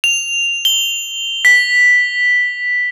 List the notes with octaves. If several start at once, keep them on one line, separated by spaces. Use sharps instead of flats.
F7
G7
B6